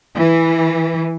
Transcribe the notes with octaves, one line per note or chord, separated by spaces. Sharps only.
E3